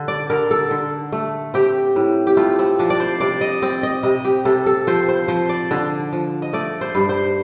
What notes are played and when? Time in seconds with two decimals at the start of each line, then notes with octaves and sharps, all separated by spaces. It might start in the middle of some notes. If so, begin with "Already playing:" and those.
Already playing: D3
0.08 D5
0.30 D3 A#4
0.51 A4
0.71 D3
1.12 A3
1.54 C4 G4
1.96 A2
2.27 G4
2.37 A3 F4
2.59 C4
2.79 F3 D4
2.90 D5
3.00 C5
3.20 C3 D5
3.41 D#5
3.62 C4 D5
3.83 D#5
4.03 C3 D#5
4.25 G4
4.45 C3 A4
4.66 A4
4.87 F3 C5
5.09 C5
5.28 F3 C5
5.49 D5
5.71 D3
6.13 F3
6.42 D#5
6.53 A3 D5
6.81 C5
6.95 G2
7.09 C5